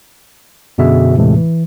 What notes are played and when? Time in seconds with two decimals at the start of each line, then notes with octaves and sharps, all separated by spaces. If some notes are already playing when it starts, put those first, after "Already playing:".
0.78 F#2 B2 D3 G#4 E5
1.16 D#2 A2 C3 E3 G#3 A3
1.36 E3